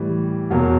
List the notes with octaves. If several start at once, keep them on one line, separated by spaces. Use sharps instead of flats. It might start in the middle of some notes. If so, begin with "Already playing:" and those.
Already playing: A2 E3 G3
E2 B2 F#3 A#3